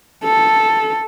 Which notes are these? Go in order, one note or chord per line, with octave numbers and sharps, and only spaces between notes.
A4